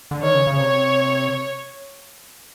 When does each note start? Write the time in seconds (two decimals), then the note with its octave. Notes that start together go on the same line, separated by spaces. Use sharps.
0.11 D3
0.22 D#3 C#5
0.35 C#3
0.47 C#3
0.60 C3 C#5